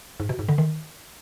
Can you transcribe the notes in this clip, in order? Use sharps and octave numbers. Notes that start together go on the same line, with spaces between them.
G#2
B2
G#2
D3
D#3